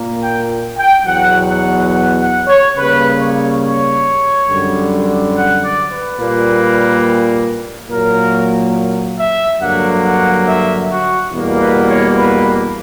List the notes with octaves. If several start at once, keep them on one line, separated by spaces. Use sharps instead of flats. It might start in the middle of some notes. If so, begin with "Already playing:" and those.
Already playing: A#2 A#3
G5
G5
E2 B2 F#3 F#5
F#5
F#5
F#5
C#5
C#3 G3 A#3 B4
C#5
C#5
F#2 D3 G3
F#5
D5
B4
A#2 G3 A#3
A#2 F#3 A#3 A#4
E5
G2 D3 F#3 A#3 F#5
F#5
E5
F#4
E2 B2 G3 A#3
B4
C#5
B4